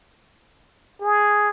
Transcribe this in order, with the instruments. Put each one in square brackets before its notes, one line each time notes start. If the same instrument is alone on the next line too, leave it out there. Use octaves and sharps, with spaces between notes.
[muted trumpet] G#4